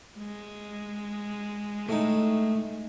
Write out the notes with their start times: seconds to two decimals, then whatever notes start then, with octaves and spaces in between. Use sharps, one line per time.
0.18 G#3
1.89 A2 A3 D#4